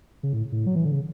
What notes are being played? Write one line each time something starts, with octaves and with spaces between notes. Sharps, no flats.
C#3
A2
A2
F#3
E3
D3
C#3